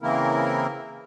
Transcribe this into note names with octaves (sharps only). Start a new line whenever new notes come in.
C#3 E3 A#3 C4 E4 A#4